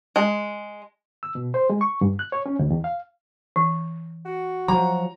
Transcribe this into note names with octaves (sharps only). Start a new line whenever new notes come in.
G#3
E6
B2
C5
G#3
C#6
G2
F#6
C#5
C#4
D2
E2
F5
E3
F#4
F3 F#3 A#5